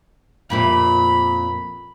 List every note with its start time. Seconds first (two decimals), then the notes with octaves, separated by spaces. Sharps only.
0.50 F2 A#2 E4 B5